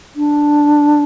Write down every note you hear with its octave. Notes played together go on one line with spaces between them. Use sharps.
D4